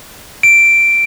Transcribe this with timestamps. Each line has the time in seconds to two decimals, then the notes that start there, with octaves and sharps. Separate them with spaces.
0.43 D7